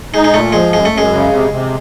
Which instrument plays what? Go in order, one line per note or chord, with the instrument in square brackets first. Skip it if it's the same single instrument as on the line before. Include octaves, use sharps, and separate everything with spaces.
[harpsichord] G#3 [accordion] D#4
[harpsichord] G#3
[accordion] A#2 [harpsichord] A3
[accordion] F3 [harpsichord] G#3
[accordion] F#2 [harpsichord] G#3
[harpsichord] A3
[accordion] F#2
[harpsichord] G#3
[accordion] C#3
C3
C3